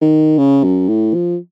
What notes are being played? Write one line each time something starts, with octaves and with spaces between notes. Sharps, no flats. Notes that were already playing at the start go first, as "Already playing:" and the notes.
D#3
C#3
F#2
A2
F3